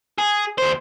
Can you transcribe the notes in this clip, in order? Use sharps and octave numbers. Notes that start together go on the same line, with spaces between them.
G#4
D#2 C5